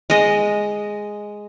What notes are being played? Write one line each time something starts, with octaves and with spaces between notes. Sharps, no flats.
G#3 D#5